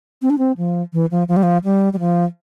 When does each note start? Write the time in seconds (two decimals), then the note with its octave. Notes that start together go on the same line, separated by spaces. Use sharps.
0.22 C4
0.30 D4
0.38 C4
0.57 F3
0.93 E3
1.11 F3
1.28 F3
1.37 G3
1.43 F3
1.64 G3
1.93 G3
2.00 F3